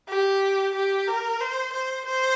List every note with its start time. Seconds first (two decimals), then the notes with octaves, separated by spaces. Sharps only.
0.09 G4
0.74 G4
1.07 A#4
1.40 C5
1.73 C5
2.05 C5